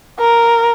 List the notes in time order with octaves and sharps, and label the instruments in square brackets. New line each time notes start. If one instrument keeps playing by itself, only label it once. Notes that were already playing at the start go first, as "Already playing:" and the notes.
[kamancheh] A#4